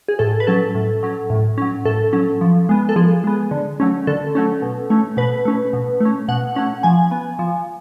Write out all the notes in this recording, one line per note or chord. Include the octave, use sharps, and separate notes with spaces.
G#4
A2 A4
B4
F#3 C#4 A4
A2
F#3 C#4
A2
F#3 C#4
A2 A4
F#3 C#4
F3
G#3 B3
A4
F3 G#4
G#3 B3
D3
F#3 A3 C#4
D3 A4
F#3 A3 C#4
B2
A3 C#4
B2 B4
A3 C#4
B2
A3 C#4
B2 F#5
A3 C#4 F#5
F3 G#5
B3
F3